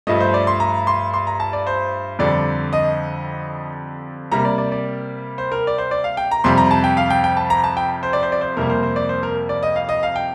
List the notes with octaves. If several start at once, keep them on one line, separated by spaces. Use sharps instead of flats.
G2 F3 A3 D#5
C5
D5
C6
A#5
C6
C6
A#5
A5
D5
C5
F2 D3 G3 D5
D#5
C3 G3 A#3 A#5
D5
D5
D5
C5
A#4
D5
C5
D5
F5
G5
A#5
F2 C3 G3 C6
A#5
A5
G5
F5
G5
G5
A5
A#5
A5
G5
C5
D5
C5
D5
C5
F2 C3 G3 A#3 A#4
C5
C5
D5
C5
A#4
D5
D#5
F5
D#5
F5
G5